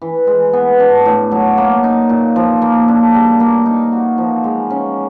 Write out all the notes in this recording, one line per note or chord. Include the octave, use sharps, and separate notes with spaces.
E3
G#3
B3
D4
A2
F#3
A#3
D#4
A#2
F3
A#3
D4
G3
A#3
D#4
F#4
F3
G#3
C#4